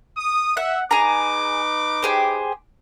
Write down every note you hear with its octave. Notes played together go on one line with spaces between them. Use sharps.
D#6
E5 F#5
D#4 G#4 B4 A#5 D6
G4 G#4 C5